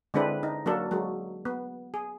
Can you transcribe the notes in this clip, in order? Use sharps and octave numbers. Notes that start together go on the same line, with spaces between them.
D3 G#3 C4 D4 E4 B4
D#4
F#3 A#3 D4 A4
F#3 G#3
B3
G#4